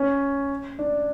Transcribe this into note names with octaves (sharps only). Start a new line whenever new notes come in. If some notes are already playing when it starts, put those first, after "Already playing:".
Already playing: C#4
D4